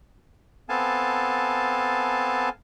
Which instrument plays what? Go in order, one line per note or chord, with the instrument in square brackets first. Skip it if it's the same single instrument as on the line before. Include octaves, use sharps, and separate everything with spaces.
[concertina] B3 C4 A4 F5 G#5 A5